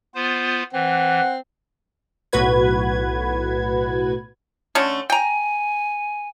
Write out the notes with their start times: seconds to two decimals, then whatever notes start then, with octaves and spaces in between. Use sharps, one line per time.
0.15 B3 F4 C5
0.73 E3 C4 F#5
2.33 B1 A2 F#4 B4 G#6
4.75 D3 A3 C#4
5.10 G5 G#5 A#5